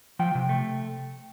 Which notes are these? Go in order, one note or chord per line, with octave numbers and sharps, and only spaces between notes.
F3 G5
C3
A3